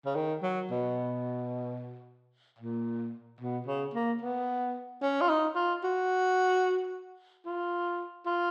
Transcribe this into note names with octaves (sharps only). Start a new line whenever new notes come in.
C#3
D#3
F#3
B2
A#2
B2
C#3
A#3
B3
C#4
F4
D#4
F4
F#4
F4
F4